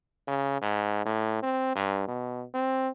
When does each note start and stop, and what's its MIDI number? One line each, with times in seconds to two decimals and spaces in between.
0.28 0.59 49
0.62 1.04 44
1.05 1.39 45
1.43 1.72 60
1.76 2.06 43
2.08 2.44 47
2.54 2.89 60